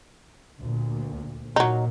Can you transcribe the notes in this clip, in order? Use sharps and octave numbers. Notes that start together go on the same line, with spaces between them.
D2 A#2
A#2 F#3 D#4